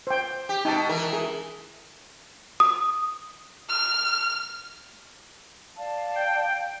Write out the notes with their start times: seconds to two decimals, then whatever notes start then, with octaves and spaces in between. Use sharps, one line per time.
0.07 C5 G5
0.49 G4
0.65 B2 D#4 G5 A5
0.89 E3 A#4
1.13 G#4
2.60 D#6
3.69 F6
5.77 D5 F5 A5
6.15 G5